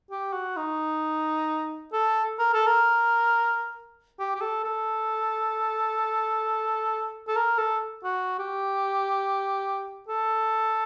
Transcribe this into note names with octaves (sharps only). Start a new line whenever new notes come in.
G4
F#4
D#4
A4
A#4
A4
A#4
G4
G4
A4
A4
A4
A#4
A4
F#4
G4
A4